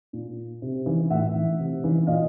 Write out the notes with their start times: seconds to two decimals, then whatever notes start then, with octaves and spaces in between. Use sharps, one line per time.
0.13 A#2
0.62 C3
0.86 E3
1.10 A2 E5 F#5
1.35 E3
1.59 C3
1.84 E3
2.07 A#2 D#5 F5